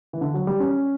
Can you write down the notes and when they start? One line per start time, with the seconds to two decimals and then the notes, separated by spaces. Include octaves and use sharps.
0.13 E3
0.21 D3
0.34 F#3
0.47 G3
0.60 C#4